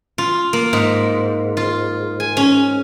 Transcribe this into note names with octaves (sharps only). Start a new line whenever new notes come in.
F4
A#3
G#2
F4
G#5
C#4